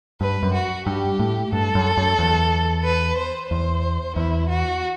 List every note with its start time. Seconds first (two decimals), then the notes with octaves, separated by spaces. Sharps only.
0.21 G2 B4
0.43 F#2
0.54 F#4
0.86 G2 G4
1.19 A2
1.53 G2 A4
1.75 F#2
1.97 F#2
2.19 E2
2.84 B4
3.18 C5
3.50 E2 C5
4.16 E2 E4
4.49 F#4